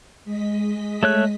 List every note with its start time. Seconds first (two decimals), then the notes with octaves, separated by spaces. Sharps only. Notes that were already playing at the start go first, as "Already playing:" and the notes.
0.25 G#3 D#5 B6
1.03 A3 C#5 F#6